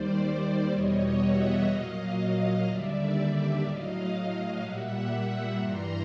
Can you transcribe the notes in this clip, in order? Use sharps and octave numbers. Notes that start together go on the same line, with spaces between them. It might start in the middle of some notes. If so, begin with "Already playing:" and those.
Already playing: D#2 D#3 G3 C5 D5
E2 B2 G3 C#5 D#5
E5 F#5
A#2 F#3 D#5 F5
D#2 D3 G3 D5 E5
A2 F#3 D#5 F5
A#2 G3 E5 F#5
G2 E3 G3 A#5 C6